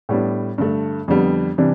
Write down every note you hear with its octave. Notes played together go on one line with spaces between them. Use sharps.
A2 G3 B3 D4
G2 D3 A3
F2 D3 G3 B3
C3 E3 G3 D4